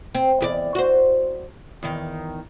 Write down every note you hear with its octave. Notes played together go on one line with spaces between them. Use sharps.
C4
E2 G4 D5
F#4 C5
E2 D#3